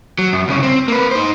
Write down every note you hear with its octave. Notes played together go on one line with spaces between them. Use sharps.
F#3
F#2
C2 C#3
C4
A#3 B4
D#4 C5